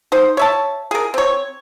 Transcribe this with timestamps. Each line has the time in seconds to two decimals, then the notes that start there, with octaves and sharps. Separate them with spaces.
0.12 D#4 C5
0.37 C#5 E5 A5
0.91 G#4 A#4
1.14 C4 C#5